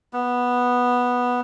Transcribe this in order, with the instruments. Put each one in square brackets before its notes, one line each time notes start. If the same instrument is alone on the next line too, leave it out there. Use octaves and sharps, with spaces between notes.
[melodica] B3